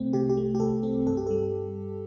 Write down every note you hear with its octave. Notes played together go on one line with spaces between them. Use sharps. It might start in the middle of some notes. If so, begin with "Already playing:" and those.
Already playing: C2 C3 A3 C4
C3 G4
G4
A3
G4
C2 A4
C4
G2 A4
G4
G3 A4